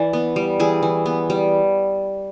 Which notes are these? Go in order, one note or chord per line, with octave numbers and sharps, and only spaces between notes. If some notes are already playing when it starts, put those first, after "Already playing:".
Already playing: E3 D5
B3
G3
E3 G#4
E3
B3
G3